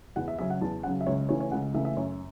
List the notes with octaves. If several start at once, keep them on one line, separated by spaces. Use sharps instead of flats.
E2 F#5
E5
C#3 F#3 C#4 E5
F#5
E2 A5
C#3 F#3 C#4 F#5
E5
C#2 C#5
C#3 E3 A3 C#5
C#5
C#2 F#5
C#3 E3 A3 E5
E5
F#2 C#5